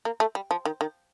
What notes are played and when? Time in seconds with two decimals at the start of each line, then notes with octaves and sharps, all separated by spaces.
0.05 A#3
0.20 A3
0.35 G3
0.51 F3
0.65 D#3
0.81 D#3